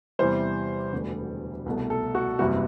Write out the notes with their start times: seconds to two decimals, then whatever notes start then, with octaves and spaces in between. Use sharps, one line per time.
0.19 E2 C3 E3 G3 C5
0.92 E1 D2 D3 G3 B3
1.66 C2 B2 A3
1.90 A4
2.15 F#4
2.39 F#1 E2 C3 G3 B3 F#4